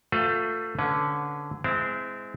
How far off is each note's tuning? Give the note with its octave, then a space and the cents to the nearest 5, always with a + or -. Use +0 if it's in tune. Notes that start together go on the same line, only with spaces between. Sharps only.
A3 +20 F4 +30 B4 +45
D3 -10 C#4 +0 B4 +0
G#3 +5 C4 -25 E4 +0